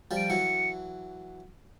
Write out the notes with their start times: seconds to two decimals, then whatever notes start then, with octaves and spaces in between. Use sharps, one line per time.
0.11 F3 G3
0.17 D7
0.30 E3 F#3 C#7